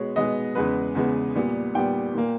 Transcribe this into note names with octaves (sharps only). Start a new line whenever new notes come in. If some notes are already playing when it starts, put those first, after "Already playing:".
Already playing: B2 G#3 B3 C#5
B2 G#3 B3 D#5
E2 C#3 G#3 B3 B4
E2 C#3 G#3 B3
A#2 G3 B3
A#2 G3 B3 G5
A#2 A#3